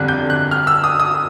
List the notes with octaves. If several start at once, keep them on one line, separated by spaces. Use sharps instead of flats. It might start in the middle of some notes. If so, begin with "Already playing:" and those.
Already playing: G1 F2 D3 G3 F#6
G6
F#6
F6
E6
D#6
D#6